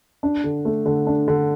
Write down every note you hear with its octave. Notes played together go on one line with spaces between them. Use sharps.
D4
D3
A3
D3
D4
D3